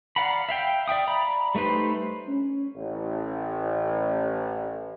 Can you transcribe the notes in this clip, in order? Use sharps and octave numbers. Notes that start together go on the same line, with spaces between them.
D5 F5 F#5 A#5 B5
E5 F5 G5
D5 E5 G5 D#6
D5 A#5 B5
G3 A3 D#4 B4 C5
C#4
A1